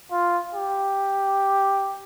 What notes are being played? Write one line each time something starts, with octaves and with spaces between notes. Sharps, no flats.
F4
G4